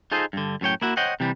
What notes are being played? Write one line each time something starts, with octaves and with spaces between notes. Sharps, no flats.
D#4 F4 G#4 A4 C5 D#5
G2 D3
F#2 A2 C#5 G5
A#3 E4 F#4
C5 C#5 D#5 F#5 G5
C3 E3 G3